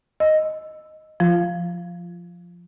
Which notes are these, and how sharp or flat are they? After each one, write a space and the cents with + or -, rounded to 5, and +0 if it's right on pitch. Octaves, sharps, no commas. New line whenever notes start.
D#5 +0 E6 +0
F3 +0 F4 -20